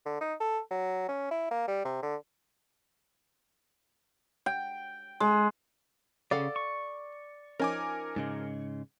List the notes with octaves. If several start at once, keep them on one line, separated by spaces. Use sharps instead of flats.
D3
D#4
A4
F#3
C#4
E4
A#3
G3
C3
D3
G5
G#3
C#3 A4 D5 F5 F#5
C#6
F3 C#4 D#4 A#4 G#5 D6
G#2 C#3 G#3